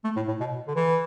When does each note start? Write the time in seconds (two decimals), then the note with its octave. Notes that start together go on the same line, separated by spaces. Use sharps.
0.04 A3
0.16 A2
0.28 A2
0.40 B2
0.68 D3
0.76 E3